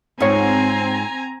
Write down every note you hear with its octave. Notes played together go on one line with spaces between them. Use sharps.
G#2 C4 D#4 F4 C#5 G#5 A#5